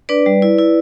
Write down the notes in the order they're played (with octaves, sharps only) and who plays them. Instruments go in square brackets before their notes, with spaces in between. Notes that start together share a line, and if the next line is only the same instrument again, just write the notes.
[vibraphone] D4 B4 D5
G3
E4
E4